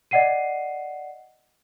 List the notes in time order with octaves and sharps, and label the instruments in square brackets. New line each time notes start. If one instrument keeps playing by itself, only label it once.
[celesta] D5 D#5 F#5 C7 D#7